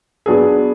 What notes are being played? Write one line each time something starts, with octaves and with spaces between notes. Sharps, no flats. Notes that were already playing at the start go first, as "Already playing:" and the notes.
F#3 B3 D4 G#4